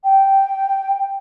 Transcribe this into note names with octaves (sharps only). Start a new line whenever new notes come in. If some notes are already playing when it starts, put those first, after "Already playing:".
G5